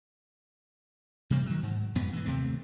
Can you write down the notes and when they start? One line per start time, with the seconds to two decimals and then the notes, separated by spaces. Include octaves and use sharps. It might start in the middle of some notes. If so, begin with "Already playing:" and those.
1.30 C3 E3 G3 A#3
1.46 D#3 F#3
1.62 G#2
1.95 F2 G#2 B2 B3
2.13 E3 G#3
2.25 D#2 C3 A3 C4